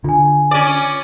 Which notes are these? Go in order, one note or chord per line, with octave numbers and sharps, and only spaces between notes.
D3 F4 G#5
C#4 D5